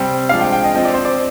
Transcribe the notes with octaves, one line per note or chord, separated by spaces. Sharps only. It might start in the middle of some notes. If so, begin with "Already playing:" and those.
Already playing: C3 G3 C4 G5
F3 G#3 D4 F5
G5
G5
D#5
F3 C4 D#5
D5
C5
D5